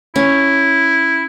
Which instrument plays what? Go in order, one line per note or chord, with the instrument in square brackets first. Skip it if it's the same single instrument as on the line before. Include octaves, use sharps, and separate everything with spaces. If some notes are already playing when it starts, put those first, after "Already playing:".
[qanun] C#4 [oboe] E4